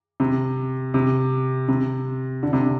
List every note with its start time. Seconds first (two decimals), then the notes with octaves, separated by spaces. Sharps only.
0.20 C3
0.94 C3
1.68 C3
2.43 D3
2.53 C3